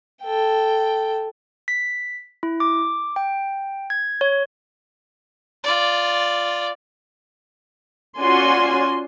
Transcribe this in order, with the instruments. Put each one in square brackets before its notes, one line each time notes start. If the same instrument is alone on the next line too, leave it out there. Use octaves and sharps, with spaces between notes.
[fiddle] A4 G5
[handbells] B6
E4
D6
G5
G#6
C#5
[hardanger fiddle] F4 D5
[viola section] C#4 F4 F#4 D5 G#5 C6